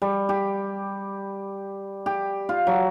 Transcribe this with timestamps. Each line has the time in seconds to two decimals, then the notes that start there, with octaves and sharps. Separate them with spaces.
0.02 G3
0.29 G4
2.06 G4
2.49 F4
2.67 F#3